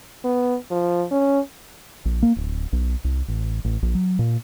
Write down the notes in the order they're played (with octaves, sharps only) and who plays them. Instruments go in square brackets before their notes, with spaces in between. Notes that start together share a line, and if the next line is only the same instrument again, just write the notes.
[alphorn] B3
F3
C#4
[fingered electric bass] A#1
A#3
D1
B1
C2
A1
A1
A#1
F#3
A#2